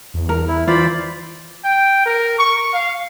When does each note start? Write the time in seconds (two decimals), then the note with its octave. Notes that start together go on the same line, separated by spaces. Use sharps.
0.14 E2
0.29 A#4
0.48 E4
0.68 E3 F4 C5 D5 B5
1.64 G5
2.06 A#4
2.39 C#6
2.73 F5